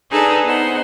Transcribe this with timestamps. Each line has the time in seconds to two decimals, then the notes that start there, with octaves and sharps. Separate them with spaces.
0.11 D4 D#4 G#4 A4 B4
0.46 B3 D#4 C5 F#5